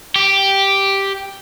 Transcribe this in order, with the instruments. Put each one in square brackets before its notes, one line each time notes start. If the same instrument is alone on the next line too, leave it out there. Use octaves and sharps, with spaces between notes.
[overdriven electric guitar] G4